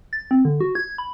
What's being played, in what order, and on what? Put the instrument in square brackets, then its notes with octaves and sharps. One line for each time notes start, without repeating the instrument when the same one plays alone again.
[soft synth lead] A6
C4
D3
F#4
G#6
B5